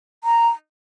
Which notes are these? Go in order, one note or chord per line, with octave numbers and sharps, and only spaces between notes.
A#5